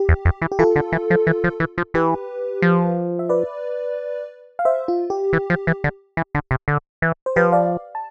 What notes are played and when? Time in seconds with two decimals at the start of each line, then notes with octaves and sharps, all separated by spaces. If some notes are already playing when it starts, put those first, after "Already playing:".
Already playing: G4
0.09 E2
0.25 F2
0.42 E3
0.52 G4
0.59 E3 F4 A4
0.76 D3
0.92 E3
1.10 F3
1.27 E3
1.44 F3
1.60 E3
1.78 F3
1.94 E3 G4 B4
2.62 F3
3.19 E5
3.29 B4 D5
4.59 F5
4.65 C5 E5
4.88 F4
5.10 G4
5.33 E3
5.50 F3
5.67 E3
5.84 D3
6.17 E3
6.35 D3
6.51 C3
6.68 D3
7.02 E3
7.26 C5
7.36 F3 G4 B4
7.52 D5 F5
7.95 A5